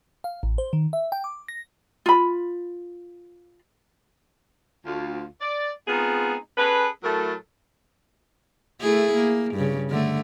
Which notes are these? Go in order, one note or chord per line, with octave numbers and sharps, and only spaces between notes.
F5
A1
C5
D#3
E5
G5
D6
A#6
F4 B5
D2 F4
D5
G#3 B3 C4 D#4 F4 G#4
C#4 G#4 A4 B4
A2 F#3 A3 E4 A4 A#4
A3 E4 G#4
A#3
G2 C#3
D3 A3